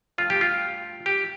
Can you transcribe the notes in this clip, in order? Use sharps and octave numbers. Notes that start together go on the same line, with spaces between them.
G2 F3 A3 F4
G4
F4
G4